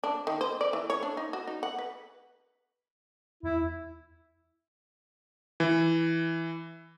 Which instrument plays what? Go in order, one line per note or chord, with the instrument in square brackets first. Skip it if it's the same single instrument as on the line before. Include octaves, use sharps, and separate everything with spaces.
[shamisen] D4
D#3
C5
D5
E3
C#5
D4
D#4
F#4
D#4
F#5
B4
[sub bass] E2 [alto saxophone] E4
[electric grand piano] E3